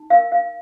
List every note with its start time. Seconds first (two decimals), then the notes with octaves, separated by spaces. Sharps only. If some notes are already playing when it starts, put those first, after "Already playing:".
Already playing: D#4
0.10 A#4 F5
0.32 F5